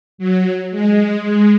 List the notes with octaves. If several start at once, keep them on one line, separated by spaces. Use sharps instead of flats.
F#3
G#3
G#3